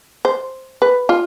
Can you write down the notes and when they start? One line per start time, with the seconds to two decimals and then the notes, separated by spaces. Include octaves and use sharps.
0.25 C5
0.82 B4
1.09 F4